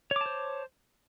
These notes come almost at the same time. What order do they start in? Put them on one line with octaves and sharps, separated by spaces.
C#5 D6 A5 C5